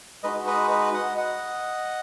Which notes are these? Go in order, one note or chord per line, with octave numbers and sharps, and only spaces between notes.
G#3 D#4 F#4 B4 D#5
B4 D#5
B4 D#5
D#5 F#5
D#5 F#5